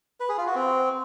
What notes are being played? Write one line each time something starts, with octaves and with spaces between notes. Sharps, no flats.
B4
G#4
F4
F#4
C4